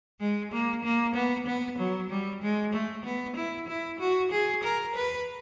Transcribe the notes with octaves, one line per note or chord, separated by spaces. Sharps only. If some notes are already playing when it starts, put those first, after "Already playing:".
G#3
A#3
A#3
B3
B3
F#3
G3
G#3
A3
B3
E4
E4
F#4
G#4
A#4
B4